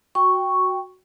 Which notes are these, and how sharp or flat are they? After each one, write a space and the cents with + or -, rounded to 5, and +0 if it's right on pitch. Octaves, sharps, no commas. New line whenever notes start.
F#4 +0 G5 +0 C#6 +0